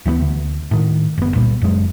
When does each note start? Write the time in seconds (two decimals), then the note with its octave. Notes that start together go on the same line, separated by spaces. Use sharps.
0.06 D2 E3 F3 B3
0.21 D2
0.71 A2 D#3
1.18 F#1 B3
1.35 C#2 A#2 G3
1.62 F#1 F#2 F#3 G#3